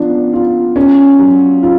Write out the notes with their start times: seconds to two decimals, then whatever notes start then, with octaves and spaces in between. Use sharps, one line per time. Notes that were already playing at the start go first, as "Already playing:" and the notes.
Already playing: F3 B3 D4
0.33 F4
0.76 C#4
1.19 F#3
1.63 F4